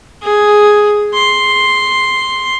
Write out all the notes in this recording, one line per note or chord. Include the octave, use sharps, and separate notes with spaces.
G#4
C6